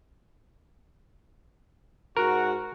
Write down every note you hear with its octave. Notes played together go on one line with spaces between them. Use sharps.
G#2 F#4 A#4